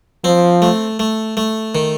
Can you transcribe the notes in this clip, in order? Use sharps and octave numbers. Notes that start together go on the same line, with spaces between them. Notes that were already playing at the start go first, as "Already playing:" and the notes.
F3 C4
A3
A3
A3
D#3